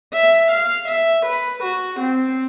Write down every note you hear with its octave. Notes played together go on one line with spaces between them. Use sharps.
E5
F5
E5
B4
F#4
C4